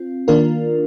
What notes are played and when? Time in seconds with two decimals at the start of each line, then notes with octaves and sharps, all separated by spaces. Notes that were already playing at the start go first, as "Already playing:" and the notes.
Already playing: C4 F4
0.28 D#3 A#3 D4 F4 A#4